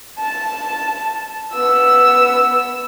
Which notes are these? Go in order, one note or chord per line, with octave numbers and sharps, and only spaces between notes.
A5
B3 E6